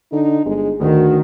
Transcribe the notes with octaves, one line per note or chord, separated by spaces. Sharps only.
D3 D#4
G1 G#3
D2 D#3 F#4